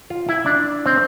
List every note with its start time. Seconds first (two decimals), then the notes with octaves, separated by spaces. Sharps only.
0.10 F4
0.29 E4
0.46 D4
0.86 C4